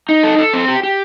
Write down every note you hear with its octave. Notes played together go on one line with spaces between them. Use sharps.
D#4
A4
A4
C4
G4
G4